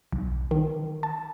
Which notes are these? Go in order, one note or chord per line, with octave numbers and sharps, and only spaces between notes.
B1
D#3
A5